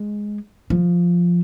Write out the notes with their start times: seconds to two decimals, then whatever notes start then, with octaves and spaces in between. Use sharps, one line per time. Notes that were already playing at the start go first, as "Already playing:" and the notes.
Already playing: G#3
0.70 F3